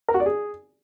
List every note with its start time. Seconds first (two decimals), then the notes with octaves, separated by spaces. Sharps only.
0.08 A#4
0.14 F#4
0.20 D5
0.26 G#4